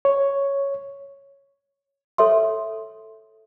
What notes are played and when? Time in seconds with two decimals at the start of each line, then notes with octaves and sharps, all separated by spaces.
0.05 C#5
2.18 A4 C#5 E5 C6